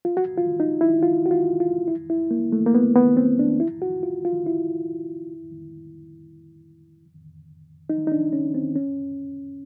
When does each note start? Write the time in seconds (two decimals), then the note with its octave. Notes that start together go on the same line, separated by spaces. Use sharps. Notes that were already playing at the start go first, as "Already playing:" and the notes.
0.05 F4
0.17 F#4
0.38 F4
0.60 D#4
0.81 E4
1.03 F4
1.26 F#4
1.31 F4
1.60 F4
1.88 E4
2.10 E4
2.31 A#3
2.52 A3
2.66 A#3
2.75 B3
2.96 B3
3.17 C4
3.39 D4
3.60 E4
3.82 F#4
4.03 F4
4.25 F4
4.46 E4
7.90 D#4
8.07 D#4
8.12 D4
8.33 C#4
8.54 C4
8.76 C#4